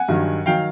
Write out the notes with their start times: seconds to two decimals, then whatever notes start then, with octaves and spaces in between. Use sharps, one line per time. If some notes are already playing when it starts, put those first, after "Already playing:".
Already playing: F#5 G#5
0.08 G2 D#3 F#3
0.46 D#3 F#3 F5 G5